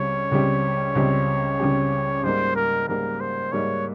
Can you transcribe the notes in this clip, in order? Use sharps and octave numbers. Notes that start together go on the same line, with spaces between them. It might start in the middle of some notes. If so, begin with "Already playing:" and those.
Already playing: C#2 C#3 G3 C4 C#5
C#2 C#3 G3 C4 G4
C#2 C#3 G3 C4 G4
C#2 C#3 G3 C4 G4
G#2 G3 A#3 C5
A#4
G#2 G3 A#3 A#4
C5
G#2 G3 A#3 C#5